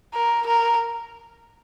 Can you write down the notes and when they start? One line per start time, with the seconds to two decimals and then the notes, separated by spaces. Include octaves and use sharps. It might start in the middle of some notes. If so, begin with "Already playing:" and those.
0.14 A#4
0.46 A#4